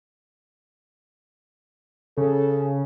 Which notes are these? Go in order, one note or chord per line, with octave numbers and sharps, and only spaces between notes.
C#3 A4